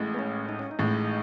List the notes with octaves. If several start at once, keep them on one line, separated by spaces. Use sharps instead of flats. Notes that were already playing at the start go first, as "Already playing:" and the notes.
Already playing: A1 A2 G#3
B3
C#4
D#4
C#4
D#4
A1 A2 G#3